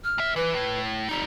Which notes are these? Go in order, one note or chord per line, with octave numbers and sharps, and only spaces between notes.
F6
A2 E5
E3 B4
A2
G3 D#4 A#5